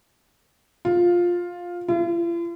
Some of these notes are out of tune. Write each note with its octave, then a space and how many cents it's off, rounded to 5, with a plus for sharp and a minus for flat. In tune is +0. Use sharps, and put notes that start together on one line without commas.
F4 +10
F4 -45